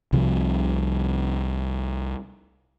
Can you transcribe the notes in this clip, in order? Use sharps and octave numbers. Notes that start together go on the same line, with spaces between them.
C2 C3 F3